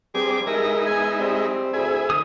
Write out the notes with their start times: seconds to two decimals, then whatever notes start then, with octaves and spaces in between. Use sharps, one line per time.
0.15 G2 G3 C4 G#4 D6
0.47 G#3 D#4 E4 A#4
0.86 E2 G#5
1.19 G3 C4
1.73 D2 E4 G#4
2.10 D#3 D#6